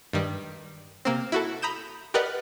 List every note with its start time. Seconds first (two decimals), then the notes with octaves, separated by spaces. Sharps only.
0.13 G2 D#3 G3
1.05 C3 A#3 C4
1.32 E4 F#4 A4
1.62 A#5 B5 D#6 G6 E7
2.14 G4 A#4 B4 D5 D#5 F#5